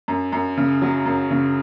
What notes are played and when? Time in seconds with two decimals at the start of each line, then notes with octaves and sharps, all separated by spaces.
0.08 F#2
0.32 F#2
0.57 C#3
0.82 F#3
1.06 F#2
1.31 C#3